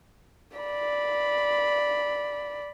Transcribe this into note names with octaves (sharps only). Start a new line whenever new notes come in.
D5 B5